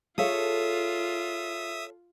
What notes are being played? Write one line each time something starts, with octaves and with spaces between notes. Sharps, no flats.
F4 G#4 A4 C#5 E5 F5 D#6